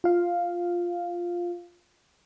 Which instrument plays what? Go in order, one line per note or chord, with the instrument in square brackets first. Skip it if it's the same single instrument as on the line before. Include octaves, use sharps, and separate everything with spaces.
[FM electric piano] F4 F5